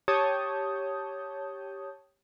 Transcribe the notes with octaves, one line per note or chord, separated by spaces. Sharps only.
G4 C#5 A5 D#6 G6